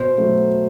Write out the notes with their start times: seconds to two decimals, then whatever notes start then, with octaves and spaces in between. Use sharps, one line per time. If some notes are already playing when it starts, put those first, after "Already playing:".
Already playing: B2 C5
0.18 F#3 A3